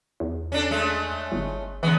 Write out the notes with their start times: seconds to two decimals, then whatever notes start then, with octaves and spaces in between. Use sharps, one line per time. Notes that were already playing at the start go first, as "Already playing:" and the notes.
0.20 E2
0.52 C#4 D4 A4
0.71 G#3 A3 C#4
1.32 G1
1.83 C#3 E3 G#3 B3